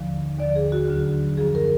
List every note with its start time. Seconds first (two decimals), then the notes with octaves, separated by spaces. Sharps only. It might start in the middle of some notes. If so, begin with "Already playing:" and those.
Already playing: D#2 D3 F3
0.39 D#2 D3 F3 D5
0.56 G#4
0.72 F#4
0.88 D2 D3 F#3
1.37 F#2 F3 G#4
1.55 A#4